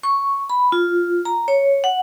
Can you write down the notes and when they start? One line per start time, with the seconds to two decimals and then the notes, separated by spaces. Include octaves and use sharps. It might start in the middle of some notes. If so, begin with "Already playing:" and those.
0.03 C#6
0.49 B5
0.72 F4
1.25 A#5
1.48 C#5
1.84 F#5